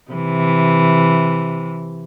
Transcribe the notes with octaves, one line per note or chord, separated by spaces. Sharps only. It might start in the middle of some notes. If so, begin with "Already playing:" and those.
C3 E3